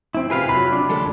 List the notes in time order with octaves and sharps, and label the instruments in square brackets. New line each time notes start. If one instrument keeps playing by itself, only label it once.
[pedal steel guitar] C4 E4
[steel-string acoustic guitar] C3 F4 [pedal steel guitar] G#4 B4 F5
[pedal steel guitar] F#3 [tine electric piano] B5
[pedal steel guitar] D4
[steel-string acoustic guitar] D2 G#3 A4